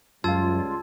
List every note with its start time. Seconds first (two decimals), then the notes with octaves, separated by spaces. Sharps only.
0.24 C#2 F#2 G3 F4 F5 A5 E6 G#6